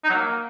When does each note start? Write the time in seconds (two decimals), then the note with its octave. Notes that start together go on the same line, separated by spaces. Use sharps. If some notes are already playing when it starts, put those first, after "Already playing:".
0.04 D#4
0.10 F#3
0.15 A#3